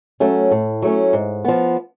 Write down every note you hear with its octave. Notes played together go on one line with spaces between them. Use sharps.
F#3 A3 C#4
A2
F#3 A3 C#4
G#2
F3 B3